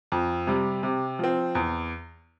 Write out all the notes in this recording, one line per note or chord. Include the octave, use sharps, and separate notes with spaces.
F2
C3 G3
C3
F3 C4
E2